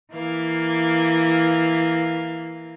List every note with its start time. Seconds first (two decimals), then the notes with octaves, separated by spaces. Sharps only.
0.13 E3 A#3 F5